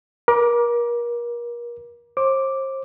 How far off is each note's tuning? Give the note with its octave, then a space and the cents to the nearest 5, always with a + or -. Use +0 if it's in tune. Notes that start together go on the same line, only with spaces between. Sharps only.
A#4 +35 D6 +0
C5 +35 D6 +0